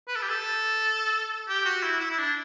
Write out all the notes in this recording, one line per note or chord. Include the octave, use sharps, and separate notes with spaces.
B4
A4
G4
A4
G4
F#4
E4
E4
E4
D4